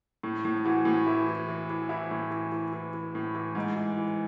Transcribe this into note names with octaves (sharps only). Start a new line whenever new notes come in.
A2
A2
E3 F#4
A2
E3 E4
E3
E3
E3
E3 E4
A2
E3
E3
E3
E3
A2
E3
G#2
E3
E3